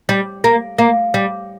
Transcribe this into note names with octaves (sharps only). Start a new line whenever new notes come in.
G3
A#3
A#3
G3